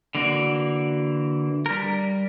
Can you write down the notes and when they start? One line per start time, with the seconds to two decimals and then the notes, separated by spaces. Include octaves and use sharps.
0.15 D3 E3 A#3 F#4 D5
1.66 G3 A#4